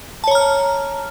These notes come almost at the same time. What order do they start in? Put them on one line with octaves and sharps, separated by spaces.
A5 C#5 A#5 F6